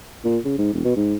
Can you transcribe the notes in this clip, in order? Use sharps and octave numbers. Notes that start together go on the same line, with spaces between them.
A#2
C#3
G#2
E1
B2
G#2